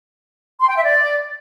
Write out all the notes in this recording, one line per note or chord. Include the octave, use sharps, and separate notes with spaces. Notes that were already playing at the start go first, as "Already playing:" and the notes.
C6
G5
E5
D5